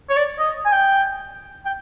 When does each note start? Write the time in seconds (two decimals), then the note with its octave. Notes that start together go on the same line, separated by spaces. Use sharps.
0.09 C#5
0.16 D5
0.39 D#5
0.65 G#5
0.72 G5
1.66 G5